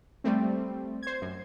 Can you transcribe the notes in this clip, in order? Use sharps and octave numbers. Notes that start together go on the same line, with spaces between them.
G3 A3 C4
C5 G#6
F#2